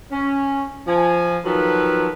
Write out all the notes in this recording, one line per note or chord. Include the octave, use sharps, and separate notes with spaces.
C#4
F3 G#5
D#3 F3 F#3 F4 A4 B4